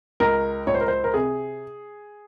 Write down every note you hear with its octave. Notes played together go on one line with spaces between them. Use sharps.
C#2 A#4
C#2 C#5
C5
A#4
C5
A#4
C3 G#4